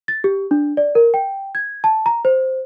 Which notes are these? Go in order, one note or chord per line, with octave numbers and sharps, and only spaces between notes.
A6
G4
D4
D5
A#4
G5
G#6
A5
A#5
C5